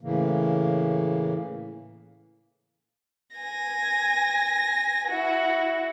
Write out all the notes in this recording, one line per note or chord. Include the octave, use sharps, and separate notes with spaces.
A2 C#3 E3 A#3
G#5 A#6
E4 F#4